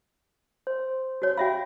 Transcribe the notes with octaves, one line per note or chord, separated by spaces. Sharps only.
C5
F#4 C#5
F#4 E5 F5 G5 B5